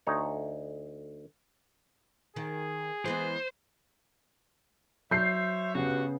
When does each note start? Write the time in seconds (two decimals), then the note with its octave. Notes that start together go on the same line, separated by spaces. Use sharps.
0.07 D2 D#4 C#5
2.36 D#3 G#4
3.05 E3 G#3 B3 C5
5.11 F#3 C5 C#5 E5 G6 C7
5.75 G2 C#3 B3 F#4